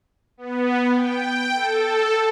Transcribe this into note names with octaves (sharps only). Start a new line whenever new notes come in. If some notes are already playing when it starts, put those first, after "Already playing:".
B3
G5
A4